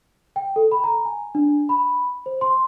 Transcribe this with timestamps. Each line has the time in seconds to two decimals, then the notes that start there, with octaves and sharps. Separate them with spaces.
0.36 G5
0.56 A4
0.72 B5
0.84 A#5
1.05 G#5
1.35 D4
1.69 B5
2.26 C5
2.41 C6